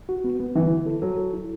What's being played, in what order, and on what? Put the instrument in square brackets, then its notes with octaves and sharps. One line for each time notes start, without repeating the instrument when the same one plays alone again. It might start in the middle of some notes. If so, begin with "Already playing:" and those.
[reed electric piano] F#4
B3
B3
[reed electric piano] D3 [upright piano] E3
[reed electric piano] E4
A4
[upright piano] F#3 [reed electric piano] A4
[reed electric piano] A4
E4